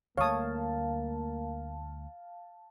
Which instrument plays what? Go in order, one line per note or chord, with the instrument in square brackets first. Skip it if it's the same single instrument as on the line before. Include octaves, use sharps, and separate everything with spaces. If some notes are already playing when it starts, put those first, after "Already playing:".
[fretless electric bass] D2 G3 A3 [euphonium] A#3 [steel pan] C#5 D#6 [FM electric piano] F5 A5